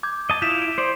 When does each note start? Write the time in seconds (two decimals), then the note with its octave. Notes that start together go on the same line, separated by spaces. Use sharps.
0.03 D6 G6 G#6
0.30 D#5 A5
0.42 E4 F4 G6 B6 E7
0.58 G6 D7
0.78 C5 D5